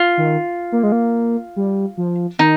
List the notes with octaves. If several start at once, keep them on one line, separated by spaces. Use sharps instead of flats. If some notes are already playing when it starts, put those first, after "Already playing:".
Already playing: F4
D#3
A#3
G#3
A#3
G3
F3
D#3 D#4